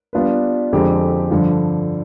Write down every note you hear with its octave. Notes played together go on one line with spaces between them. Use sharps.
G3 B3 D4 F4 B4
F2 D3 G#3 C4 G4
G2 D3 F3